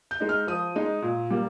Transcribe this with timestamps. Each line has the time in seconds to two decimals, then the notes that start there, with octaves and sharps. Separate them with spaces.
0.11 G6
0.20 G#3 D#4
0.29 F6
0.47 F3 D#6
0.75 G#3 D#4
1.02 A#2
1.30 G3 A#3